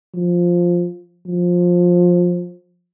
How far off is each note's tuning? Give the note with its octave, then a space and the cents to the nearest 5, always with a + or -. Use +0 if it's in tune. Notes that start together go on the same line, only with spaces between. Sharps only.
F3 +5
F3 +15